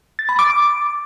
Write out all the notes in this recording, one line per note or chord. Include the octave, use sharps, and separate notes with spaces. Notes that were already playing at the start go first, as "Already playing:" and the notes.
A6
B5
D6